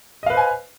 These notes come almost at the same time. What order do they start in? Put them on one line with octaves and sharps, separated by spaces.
D#5 F5 B4 C5 G#5